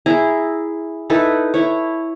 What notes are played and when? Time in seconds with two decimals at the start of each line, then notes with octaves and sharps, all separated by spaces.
0.06 E4 G#4 A#5
1.10 D#4 E4 A4 B4
1.54 E4 C#5